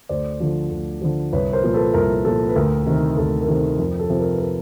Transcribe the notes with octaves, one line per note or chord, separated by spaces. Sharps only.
D2 C5 D5
D3 F3
D2
D3 F3
C2 B4 C#5
A#4 C5
A#2 F3
A4 B4
C2 A#4
A#2 F3 A4
B4
D2 A#4
C3 D#3 A#4
D2 A4
A#4
C3 D#3 A4
F2 A#4
A4
C3 F3
A#4
B4
A#4